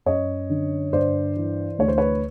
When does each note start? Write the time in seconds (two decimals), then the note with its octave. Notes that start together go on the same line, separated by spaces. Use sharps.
0.06 F#2 C#5 D#5
0.50 D3
0.93 G2 C5 D5
1.37 E3
1.79 D2 C#5
1.88 C5
1.98 B4 C#5